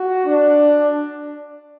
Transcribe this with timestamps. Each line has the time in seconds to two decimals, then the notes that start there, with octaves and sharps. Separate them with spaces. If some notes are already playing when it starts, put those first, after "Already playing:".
Already playing: F#4
0.26 D4